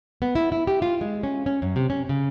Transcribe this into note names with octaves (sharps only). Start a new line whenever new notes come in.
B3
E4
E4
G4
F4
G#3
C#4
C#4
F#2
C3
C#4
C#3